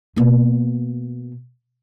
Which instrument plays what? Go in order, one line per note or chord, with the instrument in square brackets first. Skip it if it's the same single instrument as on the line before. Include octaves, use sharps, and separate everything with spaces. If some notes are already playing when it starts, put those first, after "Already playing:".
[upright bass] B2 A#3